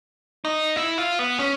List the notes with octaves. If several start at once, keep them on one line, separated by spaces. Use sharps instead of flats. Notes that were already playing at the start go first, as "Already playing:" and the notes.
D#4
E4
F4
B3
C#4